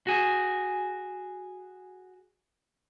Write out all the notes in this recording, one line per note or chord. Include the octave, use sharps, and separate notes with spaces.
F#4 G#4